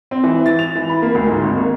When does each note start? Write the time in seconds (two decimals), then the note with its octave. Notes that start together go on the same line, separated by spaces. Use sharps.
0.11 C4
0.23 E3
0.46 A6
0.59 F7
0.76 E3
0.89 B5
1.02 A#3
1.14 D2
1.26 G#2
1.42 G#1
1.56 A#3